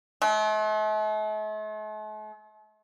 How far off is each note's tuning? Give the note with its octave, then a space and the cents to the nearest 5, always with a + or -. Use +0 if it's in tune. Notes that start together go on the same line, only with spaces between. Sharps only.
A3 -45